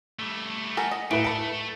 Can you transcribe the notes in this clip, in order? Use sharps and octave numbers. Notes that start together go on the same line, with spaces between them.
G3 A3
A4 A#4 F#5 G#5
D#5
A2 A3 A#3 E4 B4 D7
A5 B5 C#7